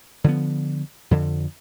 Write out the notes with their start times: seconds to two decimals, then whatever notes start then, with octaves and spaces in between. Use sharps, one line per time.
0.24 D3 F3 B3
1.11 F2 D3